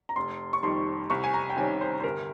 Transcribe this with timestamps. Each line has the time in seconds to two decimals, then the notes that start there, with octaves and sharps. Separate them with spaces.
0.09 A#5
0.16 F1 C6
0.53 C#6
0.63 F2 D#3 G3 C6
1.10 C2 C#6
1.24 G#5
1.34 A#5
1.50 G5
1.57 C3 D#3 G3 C#4 G#5
1.81 C5
2.00 C5
2.04 G1 A#4